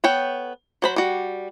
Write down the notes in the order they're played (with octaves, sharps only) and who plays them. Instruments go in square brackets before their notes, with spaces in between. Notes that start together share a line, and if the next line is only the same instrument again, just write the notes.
[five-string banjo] B3 A4 C#5 G5
F#3 C5 B5
G3 F#4